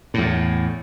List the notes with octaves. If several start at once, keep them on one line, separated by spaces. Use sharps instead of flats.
E2 A2